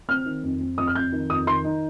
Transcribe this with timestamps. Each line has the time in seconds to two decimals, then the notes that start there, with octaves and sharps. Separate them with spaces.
0.08 C4 F6
0.26 D#3
0.43 F2
0.60 C4
0.78 F2 D#6
0.87 F6
0.95 F2 G6
1.12 D#3
1.30 F2 D#6
1.47 D#3 C6
1.64 D#4